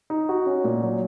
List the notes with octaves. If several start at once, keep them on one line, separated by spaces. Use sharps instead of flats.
D#4
F#4
C#4
A#2
F#3